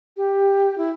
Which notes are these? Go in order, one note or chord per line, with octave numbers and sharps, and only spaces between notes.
G4
E4